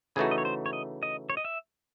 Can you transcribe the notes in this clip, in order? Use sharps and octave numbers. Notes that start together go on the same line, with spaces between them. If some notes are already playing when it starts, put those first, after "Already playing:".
C#3 E3 A3 D#4 F#4 G#4
D#5
C#5
C5
C#5
D#5
D#5
C#5
D#5
E5